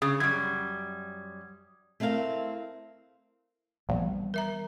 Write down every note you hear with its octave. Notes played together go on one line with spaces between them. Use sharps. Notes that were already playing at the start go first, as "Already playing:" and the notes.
C#3 G#4 D#6
F#2 G3 G#6
A3 C4 E4 A#4 F5
A#1 E3 G3 B3
A#4 E5 A#5